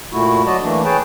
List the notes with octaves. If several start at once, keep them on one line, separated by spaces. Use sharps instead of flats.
A#2 A3 E4 F#4
F#3 F#4 D5 D#5 A5
E3 A3 A#3 D4
G#4 B4 C#5 G5 A5